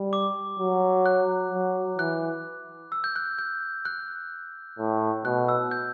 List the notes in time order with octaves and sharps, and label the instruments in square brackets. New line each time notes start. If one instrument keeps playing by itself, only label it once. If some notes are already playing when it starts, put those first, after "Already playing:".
Already playing: [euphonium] G3
[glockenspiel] D6
[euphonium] F#3
[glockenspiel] F#6
[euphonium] F#3
[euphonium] E3 [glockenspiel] F#6
[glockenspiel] E6
G6
F#6
G6
F#6
[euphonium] A2
[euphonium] B2 [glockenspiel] F#6
[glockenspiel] E6
G6